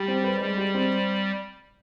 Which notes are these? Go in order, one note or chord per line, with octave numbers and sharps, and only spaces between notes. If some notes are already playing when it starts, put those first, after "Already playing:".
Already playing: G3 G4
C4
B4
G3 G#3
G4
C4